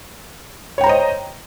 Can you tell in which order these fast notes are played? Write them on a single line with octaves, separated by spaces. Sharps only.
C#5 G5 A#5 C5 D#5